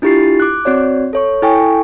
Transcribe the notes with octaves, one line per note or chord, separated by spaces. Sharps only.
D4 E4 F4 G4 A6 C7
D6 F#6
C4 F#4 C#5 D5
A4 C#5 C#6
E4 A4 G5 G#5 C#6